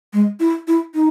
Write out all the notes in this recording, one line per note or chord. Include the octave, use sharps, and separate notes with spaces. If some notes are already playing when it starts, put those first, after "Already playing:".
G#3
E4
E4
D#4